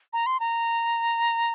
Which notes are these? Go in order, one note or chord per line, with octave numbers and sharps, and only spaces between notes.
A#5
C6
A#5